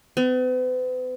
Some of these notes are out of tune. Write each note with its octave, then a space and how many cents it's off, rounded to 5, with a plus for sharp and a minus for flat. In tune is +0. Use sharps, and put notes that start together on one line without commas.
B3 +45